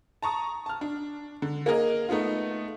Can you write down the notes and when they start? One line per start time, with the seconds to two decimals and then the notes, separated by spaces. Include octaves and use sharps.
0.22 A5 A#5 C#6 D#6
0.66 A5 F6
0.81 D4
1.42 D3
1.66 A#3 G#4 A#4 D#5
2.09 A3 B3 D#4 F4